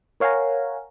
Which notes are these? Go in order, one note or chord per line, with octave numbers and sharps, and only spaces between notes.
A#4 C#5 F5 F#5 G#5 A#5